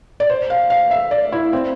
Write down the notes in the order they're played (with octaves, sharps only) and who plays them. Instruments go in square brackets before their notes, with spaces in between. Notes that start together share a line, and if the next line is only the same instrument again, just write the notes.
[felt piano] D5
C5
F5
F5
E5
D5
E4
C4